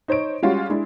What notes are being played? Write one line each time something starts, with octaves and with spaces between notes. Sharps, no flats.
D#4 C5 C#5 D7
G3 G#3 C#4 F4 F#4
G#3 D4 E4